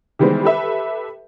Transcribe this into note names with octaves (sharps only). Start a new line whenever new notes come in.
D#3 E3 G3 G#3 B3 C5
G4 A4 B4 E5